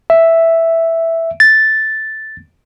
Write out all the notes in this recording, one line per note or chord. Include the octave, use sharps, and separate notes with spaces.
E5
A6